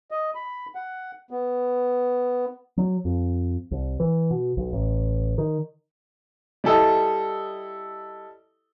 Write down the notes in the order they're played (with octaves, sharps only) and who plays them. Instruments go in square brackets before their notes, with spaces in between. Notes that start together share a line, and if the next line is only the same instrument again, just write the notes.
[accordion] D#5
B5
F#5
B3
[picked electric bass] F#3
F2
C2
E3
B2
B1
A1
D#3
[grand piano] G3 E4 A4 D#5